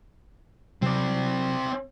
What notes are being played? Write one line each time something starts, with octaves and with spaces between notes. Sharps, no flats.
C3 F#3 C4 D5